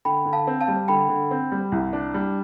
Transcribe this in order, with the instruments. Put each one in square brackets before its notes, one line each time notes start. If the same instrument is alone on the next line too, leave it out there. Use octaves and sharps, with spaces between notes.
[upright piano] D3 [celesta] G5 B5
[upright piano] D3
[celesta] F5 A5
[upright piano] C4
[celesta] F5 A5
[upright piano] G3
[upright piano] D3 [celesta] G5 B5
[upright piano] D3
C4
G3
C2
D4
G3